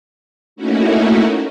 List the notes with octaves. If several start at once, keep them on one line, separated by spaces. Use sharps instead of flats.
A3 A#3 C#4 D#4 E4 F#4